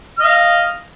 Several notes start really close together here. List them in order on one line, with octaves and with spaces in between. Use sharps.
F6 D#5 F5